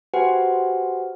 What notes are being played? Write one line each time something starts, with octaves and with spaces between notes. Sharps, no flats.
F#4 G4 B4 C5 F#5 G#5